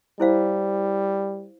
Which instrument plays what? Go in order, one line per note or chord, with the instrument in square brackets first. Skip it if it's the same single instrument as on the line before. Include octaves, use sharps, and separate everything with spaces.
[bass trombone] G3 [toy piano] E4 C5 F5